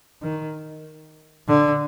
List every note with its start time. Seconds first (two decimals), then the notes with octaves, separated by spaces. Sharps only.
0.22 D#3
1.48 D3